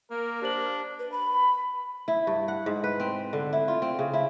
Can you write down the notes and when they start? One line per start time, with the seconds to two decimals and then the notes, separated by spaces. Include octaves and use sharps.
0.11 A#3 A#4
0.42 D4 G4 C5 F#7
0.99 B4
1.12 B5
2.08 E4
2.27 G2
2.48 F#5
2.66 G#2
2.84 B4
3.00 C4
3.33 D3
3.53 E4
3.68 F4
3.82 C4
3.99 C#3
4.13 E4